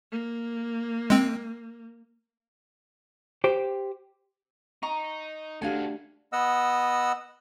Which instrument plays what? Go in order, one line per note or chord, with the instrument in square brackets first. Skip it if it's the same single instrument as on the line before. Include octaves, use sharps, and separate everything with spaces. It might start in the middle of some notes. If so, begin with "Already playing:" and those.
[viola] A#3
[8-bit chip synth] G#3 C4
[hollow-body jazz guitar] G4 C5
[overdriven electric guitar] D#4 [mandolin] A#5 C#6
[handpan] A3 D4 G4 [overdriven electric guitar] F#4 A4 [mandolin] F5 G#5
[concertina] B3 D#5 F#5 E6